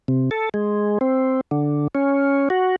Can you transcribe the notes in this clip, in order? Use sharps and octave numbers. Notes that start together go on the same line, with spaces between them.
C3
A4
G#3
C4
D3
C#4
F#4